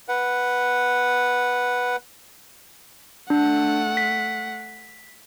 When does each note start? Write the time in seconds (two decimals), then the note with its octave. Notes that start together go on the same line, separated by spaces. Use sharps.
0.09 B4 F#5
3.30 A3 D4 F#5
3.97 B6